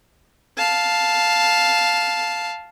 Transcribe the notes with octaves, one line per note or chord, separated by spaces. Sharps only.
F5 A5